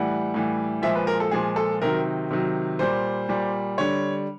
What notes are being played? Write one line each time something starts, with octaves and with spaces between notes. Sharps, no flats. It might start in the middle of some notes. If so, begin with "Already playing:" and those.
Already playing: A2 E3 G3 F#5
A2 E3 G3
A#2 F3 G#3 E5
B4
A#4
A4
A#2 F3 G#3 G#4
A4
C3 D#3 F#3 A#4
C3 D#3 F#3
A#2 G3 C5
A#2 G3
D3 G3 C#5